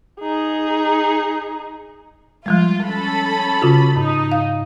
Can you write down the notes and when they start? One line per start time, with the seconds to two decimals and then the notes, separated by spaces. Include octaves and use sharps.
0.20 D#4 G#4
2.46 F3 G3 G#3 F4
2.86 C#4 A4 B5
3.62 C#3 F4 F#4
3.96 G#2 D#4
4.32 F5